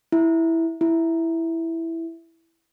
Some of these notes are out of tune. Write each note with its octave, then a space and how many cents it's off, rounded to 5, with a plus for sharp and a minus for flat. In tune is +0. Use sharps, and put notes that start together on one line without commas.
E4 -5
E4 +0